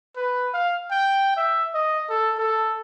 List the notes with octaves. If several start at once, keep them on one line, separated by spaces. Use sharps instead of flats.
B4
F5
G5
E5
D#5
A4
A4